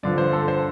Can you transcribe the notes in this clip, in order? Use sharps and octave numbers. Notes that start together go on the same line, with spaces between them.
G2 D3 F3 D5
C5
A4
C5